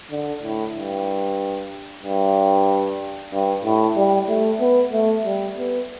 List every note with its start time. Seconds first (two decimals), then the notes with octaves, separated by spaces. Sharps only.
0.11 D3
0.42 A2
0.75 G2
2.03 G2
3.32 G2
3.64 A2
3.96 G3
4.29 A3
4.60 B3
4.93 A3
5.25 G3
5.58 B3